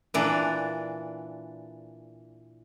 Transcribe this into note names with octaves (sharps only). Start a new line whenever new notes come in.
A#2 E3 D4